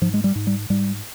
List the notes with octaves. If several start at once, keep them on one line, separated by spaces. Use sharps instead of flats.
G#2 F3
G#3
G3
G#2
G3
G#2 G3